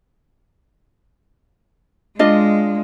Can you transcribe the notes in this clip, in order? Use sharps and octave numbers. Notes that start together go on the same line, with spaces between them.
G#3 D4 F4 D#5